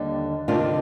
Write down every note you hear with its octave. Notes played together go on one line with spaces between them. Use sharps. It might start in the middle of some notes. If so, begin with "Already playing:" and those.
Already playing: D#2 D3 G3
D2 C3 D#3 D4 F4